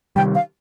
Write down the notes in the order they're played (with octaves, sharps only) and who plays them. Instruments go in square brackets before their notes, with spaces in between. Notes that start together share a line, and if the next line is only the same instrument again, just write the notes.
[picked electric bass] C3 D#3 G3 [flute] G5
[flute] F5